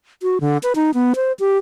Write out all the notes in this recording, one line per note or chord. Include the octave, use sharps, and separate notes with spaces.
F#4
D3
B4
D#4
B3
C5
G4